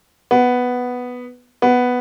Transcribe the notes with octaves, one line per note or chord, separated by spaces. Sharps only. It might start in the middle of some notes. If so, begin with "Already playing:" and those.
B3
B3